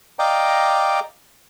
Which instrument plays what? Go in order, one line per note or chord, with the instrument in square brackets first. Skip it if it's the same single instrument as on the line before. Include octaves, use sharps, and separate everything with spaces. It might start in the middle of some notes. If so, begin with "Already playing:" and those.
[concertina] D5 D#5 F5 G5 A#5 D6